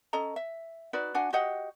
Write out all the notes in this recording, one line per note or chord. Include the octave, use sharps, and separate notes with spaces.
C#4 A4 D#5 A#5
E5
D#4 F#4 B4 D5
D4 F#4 F#5 G#5
F#4 G4 D#5 F#5